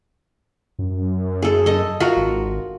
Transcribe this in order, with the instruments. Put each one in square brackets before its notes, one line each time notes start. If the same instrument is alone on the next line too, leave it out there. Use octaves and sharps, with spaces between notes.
[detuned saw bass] F#2
[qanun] G#4 A4
A4 D#5
F4 F#4 A#4
[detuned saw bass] G#1